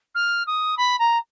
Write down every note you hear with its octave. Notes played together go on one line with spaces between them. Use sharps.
F6
D#6
B5
A#5